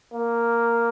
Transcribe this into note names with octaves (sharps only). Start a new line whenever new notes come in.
A#3